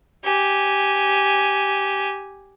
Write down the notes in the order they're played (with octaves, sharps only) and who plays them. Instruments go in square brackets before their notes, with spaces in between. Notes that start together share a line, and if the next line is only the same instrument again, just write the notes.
[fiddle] G4 G#5